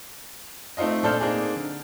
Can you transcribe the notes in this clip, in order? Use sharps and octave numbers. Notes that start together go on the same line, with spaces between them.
A3 C4 D#4 F4 D#5
A#2 D4 A4 C5 F6 G6
A#3 C4 D4 D#4 G#4
D3